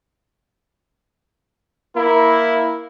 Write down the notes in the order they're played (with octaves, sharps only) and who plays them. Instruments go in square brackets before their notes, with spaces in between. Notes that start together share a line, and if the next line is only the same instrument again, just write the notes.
[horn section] A#3 A#4 [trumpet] E4